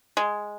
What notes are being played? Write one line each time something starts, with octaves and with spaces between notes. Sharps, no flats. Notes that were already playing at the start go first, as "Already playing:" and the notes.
G#3